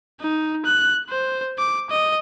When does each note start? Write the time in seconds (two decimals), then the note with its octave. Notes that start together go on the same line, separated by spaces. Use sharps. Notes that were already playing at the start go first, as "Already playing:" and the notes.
0.20 D#4
0.65 F#6
1.10 C5
1.58 D6
1.90 D#5